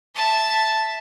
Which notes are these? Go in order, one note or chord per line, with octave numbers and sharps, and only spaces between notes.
E5 A5